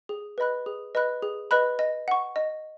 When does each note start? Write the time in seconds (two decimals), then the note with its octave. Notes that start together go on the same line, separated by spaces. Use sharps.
0.09 G#4
0.38 B4 D#5 B5 F#6
0.66 G#4
0.95 B4 D#5 B5 F#6
1.22 G#4
1.51 B4 D#5 B5 F#6
1.79 D#5
2.08 F#5 C#6
2.36 D#5